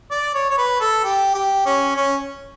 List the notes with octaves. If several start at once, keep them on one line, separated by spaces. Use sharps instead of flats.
D5
C#5
C#5
B4
A4
G4
G4
C#4
C#4